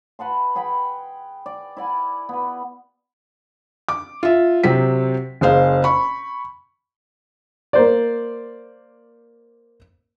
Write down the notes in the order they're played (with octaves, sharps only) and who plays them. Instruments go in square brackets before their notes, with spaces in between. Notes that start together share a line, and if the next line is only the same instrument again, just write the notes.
[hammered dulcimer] B4 F#5 A5 C6
G#4 F#5 G5 B5
D5
E4 D5 F#5 G#5
B3 B4
[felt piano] D6
F4 E5
C3 F#3 C4 B6
F#1 G#4 C5 F5
B5 C#6
[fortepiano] A#3 C5 D5